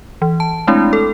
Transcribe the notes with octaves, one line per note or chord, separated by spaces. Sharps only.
E3
A5
G#3 A3 C4 D4 E4
A4